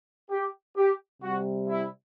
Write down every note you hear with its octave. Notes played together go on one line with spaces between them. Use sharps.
G4
G4
C3 G3 F#4
E4